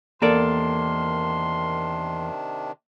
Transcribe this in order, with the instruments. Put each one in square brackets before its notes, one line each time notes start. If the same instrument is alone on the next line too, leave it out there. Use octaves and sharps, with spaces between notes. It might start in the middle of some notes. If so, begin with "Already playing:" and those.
[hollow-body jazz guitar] E2 A4 D5 [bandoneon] C3 D#3 D4 [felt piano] A#3 [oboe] C6